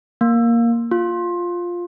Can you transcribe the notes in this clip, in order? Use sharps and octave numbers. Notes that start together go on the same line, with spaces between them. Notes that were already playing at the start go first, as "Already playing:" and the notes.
A#3
F4